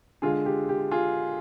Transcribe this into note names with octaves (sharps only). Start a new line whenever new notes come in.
D3 G#3 F4 G#4
G4
G4
F4 G#4